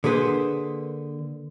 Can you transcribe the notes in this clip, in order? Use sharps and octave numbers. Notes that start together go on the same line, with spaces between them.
D3 A#3 G#4 B4 C5